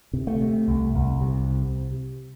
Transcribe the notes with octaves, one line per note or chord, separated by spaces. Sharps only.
C3
A3
C3
C2
C2
C3